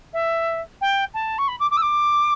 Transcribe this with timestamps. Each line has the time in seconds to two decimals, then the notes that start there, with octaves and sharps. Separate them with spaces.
0.13 E5
0.81 G5
1.14 A5
1.38 C#6
1.48 B5
1.59 D6
1.71 D6
1.77 E6
1.82 D6